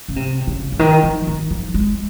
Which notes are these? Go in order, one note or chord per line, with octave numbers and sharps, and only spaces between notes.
C#3
C3
C#3
C#3
D#3
F3
D#3
F3
G#3